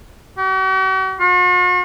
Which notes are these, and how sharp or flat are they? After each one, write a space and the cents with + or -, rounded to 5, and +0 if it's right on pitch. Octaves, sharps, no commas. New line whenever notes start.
F#4 +45
F#4 -45